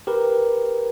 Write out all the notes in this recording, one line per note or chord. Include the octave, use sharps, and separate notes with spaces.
G4 A#4 B4